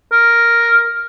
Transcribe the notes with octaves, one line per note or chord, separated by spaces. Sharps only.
A#4